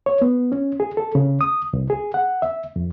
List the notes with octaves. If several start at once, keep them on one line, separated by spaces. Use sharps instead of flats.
C#5
B3
C#4
G#4
A4
C#3
D#6
C2
G#4
F#5
E5
F2